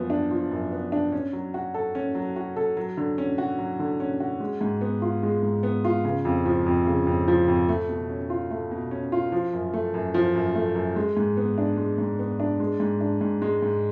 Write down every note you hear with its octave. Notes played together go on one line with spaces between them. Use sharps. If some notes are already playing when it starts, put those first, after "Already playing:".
Already playing: F#2 F3 B3
D4
F3
F#2
B3
D4
C#4
F#3
F#4
A4
C#4
F#3
F#4
A4
F#3
D3
C#4
F#4
F#3
D3
C#4
F#4
G#3
G#2
B3
F4
G#3
G#2
B3
F4
C#3
F2
F3
F2
C#3
F2
F3
F2
A3
B2
C#4
F4
A3
B2
C#4
F4
F3
F#2
A3
F#2
F3
F#2
A3
F#2
G#3
G#2
B3
D4
G#3
G#2
B3
D4
G#3
G#2
D4
G#2
G#3
G#2